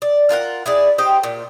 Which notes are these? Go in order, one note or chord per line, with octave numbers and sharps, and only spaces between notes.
D5
D4 F4 A#4 F#5
E4 G#4 D5
G4 C5 D#5
A#2